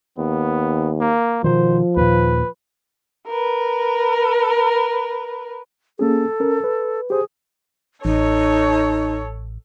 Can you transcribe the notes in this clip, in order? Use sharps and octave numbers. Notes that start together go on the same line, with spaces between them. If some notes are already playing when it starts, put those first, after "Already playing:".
D#2 B3
A#3
B2 D#3 F3 C5
D#2 A#2 B4
A#4 B4
A#3 C#4 G#4 A4
C#4 A#4
B4
G4 G#4 C5
A1 D#4 A4 C#5